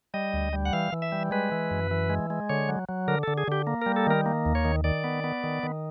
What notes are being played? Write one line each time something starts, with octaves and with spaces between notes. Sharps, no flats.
G3 D#5
D2
G3
F#5
E3 F5
E3
E5
G3
G#3 B4
E3
F#2
E3
G#3
G#3
D3 C#5
F#3
F#3
D3 A#4
D3 A4
G#4
D3 G4
A#3
G3 A#4
A4
D#3 A#4
A#3
D#2
C#5
D#3
D#3 D5
B3
B3
D#3
D#3